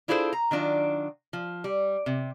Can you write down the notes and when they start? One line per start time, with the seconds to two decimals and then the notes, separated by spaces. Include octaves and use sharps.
0.08 D4 E4 F4 G#4 A4 C5
0.33 A#5
0.51 D#3 F#3 D4 F4
1.33 F3
1.64 G3
2.06 C3